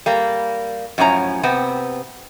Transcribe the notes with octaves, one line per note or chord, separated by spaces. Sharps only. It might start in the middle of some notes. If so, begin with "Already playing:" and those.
G3 A#3
F#2 A2 F3 C#4 A#5
C3 B3 C4